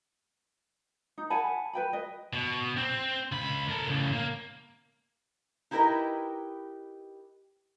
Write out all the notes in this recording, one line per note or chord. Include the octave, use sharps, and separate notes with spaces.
D#4
F#5 G#5 A5 B5
B4 G5 B5
D#5
B2
C4
C#2 B5
A4 A#4
A2 C#3
A#3
D#4 E4 G4 A#4 B4 D#5